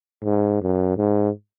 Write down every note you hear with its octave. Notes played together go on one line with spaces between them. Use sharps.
G#2
F#2
G#2